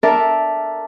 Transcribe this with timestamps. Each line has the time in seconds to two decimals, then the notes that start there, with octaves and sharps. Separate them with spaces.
0.03 D4 A4 A#4 D5 E5